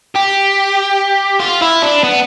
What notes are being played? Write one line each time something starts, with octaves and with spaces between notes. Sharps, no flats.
G4
F4
E4
D4
B3